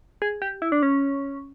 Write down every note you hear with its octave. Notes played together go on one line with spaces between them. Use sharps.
G#4
G4
E4
D4
C#4